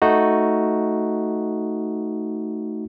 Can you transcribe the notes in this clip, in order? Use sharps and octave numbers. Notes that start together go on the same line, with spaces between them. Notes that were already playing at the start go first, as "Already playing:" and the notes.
A3 D#4 F#4